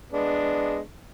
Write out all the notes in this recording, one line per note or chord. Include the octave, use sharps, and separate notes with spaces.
G#3 B3 D4